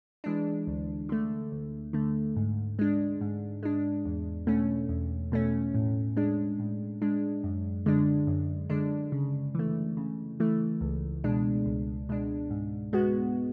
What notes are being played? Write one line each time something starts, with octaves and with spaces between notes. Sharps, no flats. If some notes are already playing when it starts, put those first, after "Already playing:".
E3 G#3 D4
D2
D3 A3
D2
D3 A3
G#2
G#3 D4
G#2
G#3 D4
E2
B2 A3 C#4
E2
B2 A3 C#4
A2
G#3 D4
A2
G#3 D4
F#2
D3 G#3 D4
F#2
D3 G#3 D4
C#3
E3 A3
C#3
E3 A3
C#2
B2 G#3 D4
C#2
B2 G#3 D4
G#2
G#3 B3 F#4